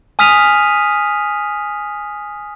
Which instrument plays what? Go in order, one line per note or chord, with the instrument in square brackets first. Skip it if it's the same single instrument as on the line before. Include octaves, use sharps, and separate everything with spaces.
[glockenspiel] G#5 D#6 F6 B6 D#7 F7